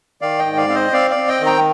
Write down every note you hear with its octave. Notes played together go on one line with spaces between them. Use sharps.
D#3 D5 F5
D#5 G5
G#2
D5 F5
C4 F5
C5 D#5
C4 D5 F5
D5 F5
C4
D#5 G5
D#3
G5 A#5